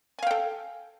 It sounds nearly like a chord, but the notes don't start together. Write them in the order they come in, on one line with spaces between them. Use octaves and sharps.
G#5 F5 G5 A4